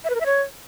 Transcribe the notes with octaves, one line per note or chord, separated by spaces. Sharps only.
E5
B4
A#4
E5
C#5